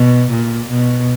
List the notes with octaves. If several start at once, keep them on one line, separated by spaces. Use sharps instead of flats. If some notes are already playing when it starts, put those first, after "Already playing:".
Already playing: B2
A#2
B2